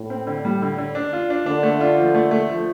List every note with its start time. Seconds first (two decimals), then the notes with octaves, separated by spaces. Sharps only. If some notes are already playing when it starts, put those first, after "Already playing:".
Already playing: A2
0.10 C4
0.27 D3
0.45 G3
0.62 D3
0.78 D3
0.95 D4
1.13 F4
1.30 D4
1.46 D3 D4
1.63 A3
1.80 F4
1.98 F3
2.14 A3
2.31 A3
2.49 F3